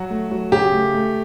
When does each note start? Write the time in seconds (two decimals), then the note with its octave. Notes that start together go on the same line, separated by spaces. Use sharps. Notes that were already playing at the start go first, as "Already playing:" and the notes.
Already playing: F#3 F#4
0.10 A3
0.31 F#3
0.52 C#3 G4
0.73 A3
0.94 A3